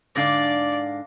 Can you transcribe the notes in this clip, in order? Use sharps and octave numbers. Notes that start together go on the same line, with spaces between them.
G#2 D3 D4 D5 F5 D6 A#6